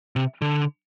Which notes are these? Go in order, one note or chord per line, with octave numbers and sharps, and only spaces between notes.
C3
D3